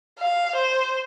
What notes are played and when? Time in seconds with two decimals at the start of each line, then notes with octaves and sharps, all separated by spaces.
0.19 F5
0.55 C5